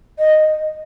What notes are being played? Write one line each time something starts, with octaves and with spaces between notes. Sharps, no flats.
D#5